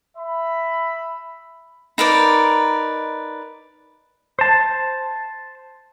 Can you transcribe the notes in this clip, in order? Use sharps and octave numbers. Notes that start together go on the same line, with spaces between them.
E5 B5
D#4 A#4 B4 D5
C5 A5